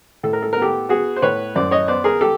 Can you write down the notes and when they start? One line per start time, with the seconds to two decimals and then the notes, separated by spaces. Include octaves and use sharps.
0.23 A2 A4
0.33 A#4
0.42 A4
0.53 B3 A#4
0.62 G4 A4
0.89 B3 F#4 G#4
1.16 C5
1.22 A2 B4 C#5
1.55 F#2 C5 D5
1.71 C#5 D#5
1.88 B3 C5 D5
2.04 G#4 A#4
2.21 G4 A4